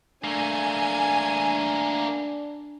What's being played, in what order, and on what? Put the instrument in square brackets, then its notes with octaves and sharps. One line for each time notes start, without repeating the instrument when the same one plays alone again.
[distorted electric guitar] A3 A#3 [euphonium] D4 [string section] G#5